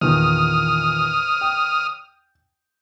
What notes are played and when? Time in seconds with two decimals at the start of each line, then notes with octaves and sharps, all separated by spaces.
0.01 E2 A#2 D#3 D#6 F6
1.41 G5